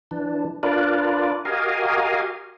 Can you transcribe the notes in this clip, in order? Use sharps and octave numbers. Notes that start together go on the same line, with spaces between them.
E3 D4
D4 F4 A#4 B4 D5
F#4 G4 A#4 D#5 F5 G#5